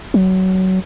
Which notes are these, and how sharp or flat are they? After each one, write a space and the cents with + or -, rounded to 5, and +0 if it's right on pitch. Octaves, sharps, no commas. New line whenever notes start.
F#3 +20